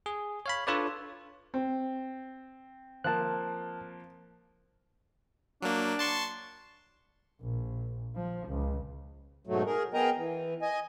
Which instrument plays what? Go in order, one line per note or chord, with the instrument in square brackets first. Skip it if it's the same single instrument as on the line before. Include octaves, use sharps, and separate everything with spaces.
[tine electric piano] G#4
C#5 F5 B5
D4 F4 A4 B4 C#5 D5
[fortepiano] C4
[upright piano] F3 A#3 [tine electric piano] A5 F#6
[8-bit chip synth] F#3 A#3 [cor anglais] D4
[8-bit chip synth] A5 C6 C#6
[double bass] A#1
F3
C#2
[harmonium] G#2 B2 F#3 A3
G#4 A#4
B3 G#4 A#4 D#5 G5 A#5
E3
D#5 G#5